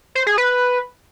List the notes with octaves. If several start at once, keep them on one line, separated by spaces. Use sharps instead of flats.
C5
G#4
B4